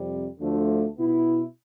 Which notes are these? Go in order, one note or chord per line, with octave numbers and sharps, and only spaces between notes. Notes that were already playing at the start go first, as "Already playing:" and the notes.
Already playing: F2 C3 G3
D2 D3 F3 A3
B2 B3 E4